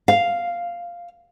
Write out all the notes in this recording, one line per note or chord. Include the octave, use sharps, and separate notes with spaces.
F5